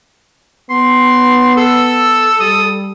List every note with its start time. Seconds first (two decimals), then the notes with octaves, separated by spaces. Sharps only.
0.70 B3 C6
1.57 A4 E6
2.40 G3 D#6